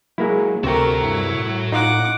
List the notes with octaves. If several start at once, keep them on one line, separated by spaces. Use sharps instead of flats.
F#3 G#3 A#3 E4
D2 C3 A3 F#4 A#4 G5 A#5
G2 E4
A2
A2 D#4 F4 F#5 D6